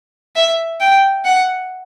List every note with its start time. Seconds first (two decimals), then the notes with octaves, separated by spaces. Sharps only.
0.36 E5
0.80 G5
1.24 F#5